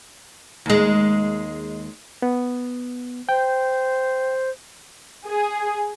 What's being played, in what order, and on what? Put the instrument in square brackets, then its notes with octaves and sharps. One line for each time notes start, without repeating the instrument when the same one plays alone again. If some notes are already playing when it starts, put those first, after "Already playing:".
[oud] D#2 G#3
[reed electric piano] B3
[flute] C5 [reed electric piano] G5
[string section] G#4